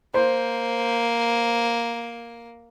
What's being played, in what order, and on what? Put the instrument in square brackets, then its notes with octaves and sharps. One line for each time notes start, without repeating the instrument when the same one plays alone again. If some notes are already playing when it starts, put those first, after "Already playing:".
[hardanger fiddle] A#3 [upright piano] C5